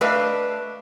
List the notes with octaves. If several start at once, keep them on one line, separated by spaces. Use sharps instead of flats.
A3 D4 B4 D#5 F5